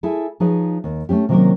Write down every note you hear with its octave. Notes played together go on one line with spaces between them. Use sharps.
E4 G#4 A4 G#5
F3 D#4 G#4 B4 C#5
D#2
A3 C4 C#4 G4
C3 D#3 F#3 A#3 C#4 A#4